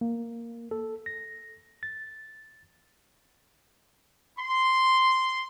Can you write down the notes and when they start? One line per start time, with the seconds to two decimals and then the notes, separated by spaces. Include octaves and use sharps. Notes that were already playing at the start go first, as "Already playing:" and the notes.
0.01 A#3
0.71 A4
1.06 A#6
1.83 A6
4.39 C6